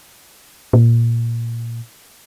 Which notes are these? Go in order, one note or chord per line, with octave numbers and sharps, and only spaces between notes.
A#2